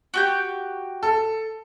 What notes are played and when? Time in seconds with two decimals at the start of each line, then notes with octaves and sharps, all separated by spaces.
0.14 F#4 G4 G6
1.03 A4